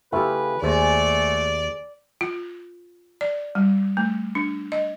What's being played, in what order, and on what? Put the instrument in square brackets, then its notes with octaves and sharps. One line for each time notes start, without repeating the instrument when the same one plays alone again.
[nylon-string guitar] C#3 G4 [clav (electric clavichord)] A3 E4 F4 [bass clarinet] B4
[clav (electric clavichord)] D#2 [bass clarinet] A3 [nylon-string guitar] G#4 C5 G#5 [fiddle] D5
[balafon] F4
D5
G3
A3
D4
D#5